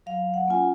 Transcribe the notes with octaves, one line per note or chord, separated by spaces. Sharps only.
F#3 F5
F#5
A#3 C#4 F4 G#5